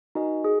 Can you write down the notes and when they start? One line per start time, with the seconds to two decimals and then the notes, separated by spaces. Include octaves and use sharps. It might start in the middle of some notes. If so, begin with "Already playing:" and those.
0.15 D#4 F#4 A#4 D#5 G#5
0.44 G#4